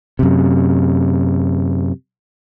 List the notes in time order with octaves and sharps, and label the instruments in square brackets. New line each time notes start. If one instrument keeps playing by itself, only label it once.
[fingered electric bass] F#2 C3